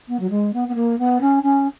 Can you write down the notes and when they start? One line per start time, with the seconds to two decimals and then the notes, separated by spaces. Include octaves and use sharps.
0.08 B3
0.19 F#3
0.30 G#3
0.53 B3
0.68 B3
0.75 A#3
0.98 B3
1.21 C#4
1.43 C#4